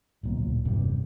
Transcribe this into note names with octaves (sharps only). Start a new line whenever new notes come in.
D1 B1 A#2
E1 G2 C3 G3